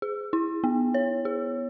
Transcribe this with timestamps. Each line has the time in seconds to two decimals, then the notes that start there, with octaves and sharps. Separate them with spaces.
0.02 G#4
0.33 E4
0.64 B3
0.94 C#5
1.25 G#4